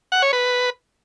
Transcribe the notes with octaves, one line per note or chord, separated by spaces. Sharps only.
F#5
C#5
B4